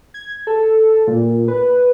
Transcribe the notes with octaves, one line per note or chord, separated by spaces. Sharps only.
G#6
A4
A#2
B4